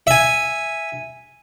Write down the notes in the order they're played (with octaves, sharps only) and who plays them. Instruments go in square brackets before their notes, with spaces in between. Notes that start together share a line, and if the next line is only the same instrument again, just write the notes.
[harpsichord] E5 G#5